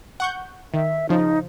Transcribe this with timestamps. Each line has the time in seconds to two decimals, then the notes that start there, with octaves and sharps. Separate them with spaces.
0.20 F#5 C#6 G6
0.74 D#3 E5
1.09 C#3 F3 D#4